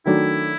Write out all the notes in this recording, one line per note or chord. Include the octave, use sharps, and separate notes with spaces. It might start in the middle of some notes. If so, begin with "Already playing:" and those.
D#3 F#3 A3 D4 E4